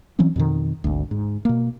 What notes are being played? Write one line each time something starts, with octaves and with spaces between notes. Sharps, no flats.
E3 F#3 C4 C#4
F2 B2 D#3
G#1 D2
G#2
B2 A#3